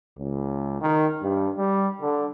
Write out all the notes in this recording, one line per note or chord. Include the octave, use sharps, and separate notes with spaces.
C#2
D#3
G2
G3
D3